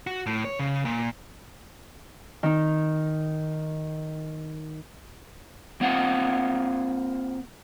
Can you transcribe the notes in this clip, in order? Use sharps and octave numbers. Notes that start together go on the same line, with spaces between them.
F#4
A2
C#5
C#3
A#2
D#3 D#4
A#3 C4 F4 F#5